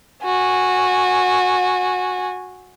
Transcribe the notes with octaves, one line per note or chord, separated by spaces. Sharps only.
F#4 G#5